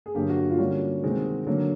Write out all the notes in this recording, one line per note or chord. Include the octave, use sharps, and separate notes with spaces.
G#4
G2 D3 F#3 A#3 G4
F#4
F4
D3 G3 A#3 C#4 F#4
C3 D#3 G#3 C4
D3 F#3 A#3